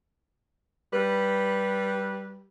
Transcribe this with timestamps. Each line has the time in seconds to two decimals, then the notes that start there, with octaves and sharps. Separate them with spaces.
0.93 G3 B4